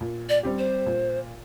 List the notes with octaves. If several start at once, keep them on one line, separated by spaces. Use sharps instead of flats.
A#2
D5
G3 C4 G4
C5
A#2